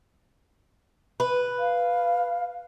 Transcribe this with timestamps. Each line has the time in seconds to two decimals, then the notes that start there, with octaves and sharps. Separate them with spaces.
1.20 B4
1.59 F5